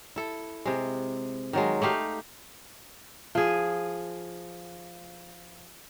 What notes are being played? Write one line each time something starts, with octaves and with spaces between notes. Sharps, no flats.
E4 A4
C3 G#3
D#3 F#3 G#3
A3 D#4 G4 F5
F3 G#4